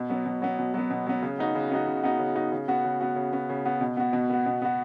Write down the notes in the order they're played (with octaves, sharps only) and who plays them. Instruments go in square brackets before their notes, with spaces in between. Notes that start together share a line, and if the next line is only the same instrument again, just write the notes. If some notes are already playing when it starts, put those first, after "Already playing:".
Already playing: [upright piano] B2
F#3 B3
B2
F#3 B3
B2
F#3 B3
B2
F#3 B3
C#3
B3 D#4 F#4
C#3
B3 D#4 F#4
C#3
B3 D#4 F#4
C#3
B3 D#4 F#4
C#3
B3 F#4
C#3
B3 F#4
C#3
B3 F#4
C#3
B3 F#4
B2
B3 F#4
B2
B3 F#4
B2
B3 F#4